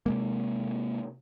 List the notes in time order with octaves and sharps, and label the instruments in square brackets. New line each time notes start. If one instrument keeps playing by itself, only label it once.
[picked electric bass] C3 G#3 A#3